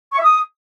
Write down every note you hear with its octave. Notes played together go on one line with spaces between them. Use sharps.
C#6
E5
D#6